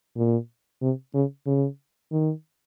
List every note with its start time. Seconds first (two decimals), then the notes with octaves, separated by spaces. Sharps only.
0.17 A#2
0.82 C3
1.14 C#3
1.47 C#3
2.12 D#3